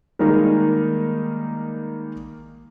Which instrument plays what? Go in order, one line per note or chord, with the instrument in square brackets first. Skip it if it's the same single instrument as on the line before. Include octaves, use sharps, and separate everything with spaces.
[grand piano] D#3 G3 G#3 A#3 D#4 A#4